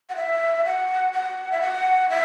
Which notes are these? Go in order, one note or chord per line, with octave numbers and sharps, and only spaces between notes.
F#5
E5
F#5
F#5
E5
F#5
E5